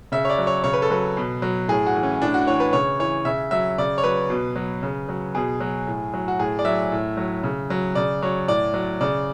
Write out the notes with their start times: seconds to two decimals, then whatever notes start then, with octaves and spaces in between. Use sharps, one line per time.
0.12 C#3 E5
0.25 C#5
0.30 D5
0.38 F#3
0.47 C#5
0.64 C#3 C#5
0.73 B4
0.82 A4
0.90 F#3 B4
1.17 B2
1.42 F#3
1.68 A2 G#4
1.86 F#4
1.95 E3
2.03 C#4
2.21 A2 D4
2.34 F#4
2.47 E3 C#5
2.60 B4
2.73 C#3 C#5
2.99 E3 C#5
3.25 C#3 E5
3.51 F#3 E5
3.78 C#3 D5
3.98 C#5
4.04 F#3 B4
4.30 B2
4.56 F#3
4.83 C#3
5.09 F#3
5.34 B2 G#4
5.60 F#3
5.87 A2
6.14 F#3
6.28 F#4
6.39 A2 G#4
6.59 D5
6.65 F#3 E5
6.92 A2
7.17 F#3
7.43 C#3
7.70 F#3
7.95 C#3 D5
8.22 F#3 C#5
8.48 A2 D5
8.74 F#3
9.01 C#3 D5